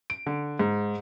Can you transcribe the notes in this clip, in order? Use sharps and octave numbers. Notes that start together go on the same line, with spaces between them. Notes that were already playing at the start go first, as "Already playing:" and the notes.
D7
D3
G#2